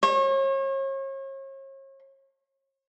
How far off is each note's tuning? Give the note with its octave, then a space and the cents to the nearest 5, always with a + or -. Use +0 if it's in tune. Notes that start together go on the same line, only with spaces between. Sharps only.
C#5 -40